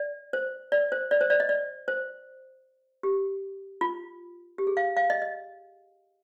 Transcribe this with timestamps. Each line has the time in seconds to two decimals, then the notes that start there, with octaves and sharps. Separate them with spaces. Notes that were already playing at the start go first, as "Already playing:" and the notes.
Already playing: D5
0.33 C5
0.72 D5
0.92 C5
1.11 D5
1.21 C5
1.30 D5
1.40 D#5
1.49 D5
1.88 C5
3.03 G4
3.81 F4
4.58 G4
4.67 G#4
4.77 F5
4.97 F5
5.10 D#5
5.22 D#5